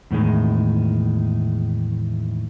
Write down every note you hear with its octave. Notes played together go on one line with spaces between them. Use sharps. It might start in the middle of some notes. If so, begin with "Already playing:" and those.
E2 A2 D#3 G#3